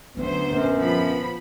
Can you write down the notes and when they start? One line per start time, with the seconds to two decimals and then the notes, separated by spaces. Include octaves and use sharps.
0.17 D2 F#3 B3 C#4 C5
0.50 A#1 F#2
0.81 F3 B5